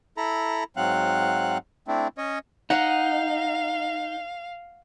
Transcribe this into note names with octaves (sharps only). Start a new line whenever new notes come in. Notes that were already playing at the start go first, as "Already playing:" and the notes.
E4 A4 A#5 B5
G#2 F#3 C4 F5 F#5 F#6
A3 C4 D4 E4
C#4 C#5 D#5
D#4 F5 F#5